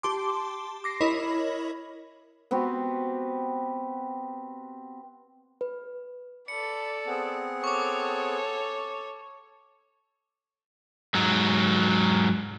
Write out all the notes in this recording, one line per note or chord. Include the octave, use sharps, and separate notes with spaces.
G4 A5 C6 D6
D6 A#6 C7
E4 A#4 C#5 D#5 B5
B3 C4 F#4 G4
B4
A4 D5 B5 C#7
B3 C4 G#4
A4 C#5 C#6 D6
G#2 F#3